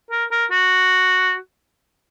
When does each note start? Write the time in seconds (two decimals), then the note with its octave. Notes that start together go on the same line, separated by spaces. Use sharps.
0.11 A#4
0.31 A#4
0.51 F#4